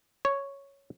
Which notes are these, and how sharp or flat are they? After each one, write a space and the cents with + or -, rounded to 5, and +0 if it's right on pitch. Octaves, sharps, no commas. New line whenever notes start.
C#5 +0